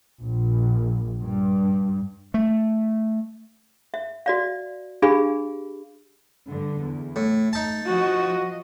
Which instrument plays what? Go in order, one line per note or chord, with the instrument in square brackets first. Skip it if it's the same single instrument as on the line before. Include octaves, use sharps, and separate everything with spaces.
[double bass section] A#1
G2
[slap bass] A3
[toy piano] E5
F#4 D5 F5
D4 G4 G#4 F5 B5
[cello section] G2 D3
E2
[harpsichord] A2 [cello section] A3
[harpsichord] D#4 A5
[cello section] F3 D#5 [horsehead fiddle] F#4